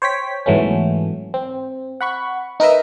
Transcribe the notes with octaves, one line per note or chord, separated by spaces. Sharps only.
C5 C#5 G5 B6
G#2 E3 F#3 A3 B3 C#4
C4
F#5 B5 C#6
D#4 A#4 B4 D#5 E5